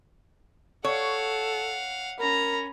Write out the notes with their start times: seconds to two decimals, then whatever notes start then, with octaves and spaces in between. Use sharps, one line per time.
0.84 A4 C#5 F5 F#5
2.19 C#4 A#4 A#5 B5